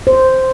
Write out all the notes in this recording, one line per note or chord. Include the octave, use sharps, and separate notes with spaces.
C5